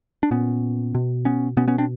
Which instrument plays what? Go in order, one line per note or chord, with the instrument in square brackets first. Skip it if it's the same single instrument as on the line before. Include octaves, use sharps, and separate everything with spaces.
[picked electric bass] D4
A#2 B3 C#4
B2
B3 C#4
B2 B3 C#4
B3 C#4
C4 D4